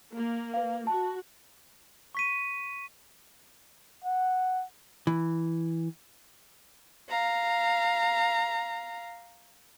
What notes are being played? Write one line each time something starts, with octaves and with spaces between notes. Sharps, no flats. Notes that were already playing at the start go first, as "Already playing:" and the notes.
A#3
B4 F5
F#4 A5
C#6 B6 D#7
F#5
E3
F5 A#5